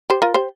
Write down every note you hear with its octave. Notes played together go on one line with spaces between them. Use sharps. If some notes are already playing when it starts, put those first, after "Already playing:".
G4 C5
F4 A#4
G4 C5